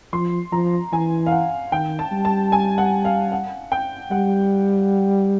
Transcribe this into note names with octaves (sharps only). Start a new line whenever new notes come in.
F3 C6
F3 A#5
E3 G#5
F5
F#5
D#3 G5
A5
G3
A5
G#5
F#5
F5
F#5
G5
G3 F#5